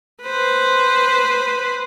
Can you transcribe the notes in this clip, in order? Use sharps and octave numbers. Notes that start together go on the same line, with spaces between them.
B4 C5